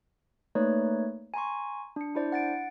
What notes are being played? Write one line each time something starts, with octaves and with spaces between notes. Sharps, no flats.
A3 A#3 D#4 B4 C#5 D5
G#5 A#5 C6 C#6
D4 C#7
D4 E4 C5 D5
F#5 A6 D7